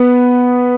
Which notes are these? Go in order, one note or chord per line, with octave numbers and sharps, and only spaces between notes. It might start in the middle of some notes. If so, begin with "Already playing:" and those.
Already playing: B3